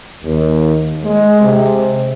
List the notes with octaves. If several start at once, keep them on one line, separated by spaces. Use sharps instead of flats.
D#2
G#3
C3